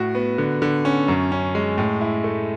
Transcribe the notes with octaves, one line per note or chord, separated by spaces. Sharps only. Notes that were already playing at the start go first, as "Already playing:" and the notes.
Already playing: A2 F#4
B3
D3
D3
C#4
F#2
C#4
G#3
A2
E4
A3